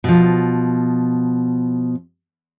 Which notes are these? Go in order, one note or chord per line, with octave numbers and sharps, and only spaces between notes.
B2 F3